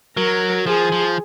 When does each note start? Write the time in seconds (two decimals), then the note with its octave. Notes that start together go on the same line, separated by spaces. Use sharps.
0.17 F#3 A#4
0.67 F3 G#4
0.92 F3